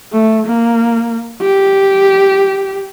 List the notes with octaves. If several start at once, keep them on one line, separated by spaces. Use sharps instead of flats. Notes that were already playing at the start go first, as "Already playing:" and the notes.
A3
A#3
G4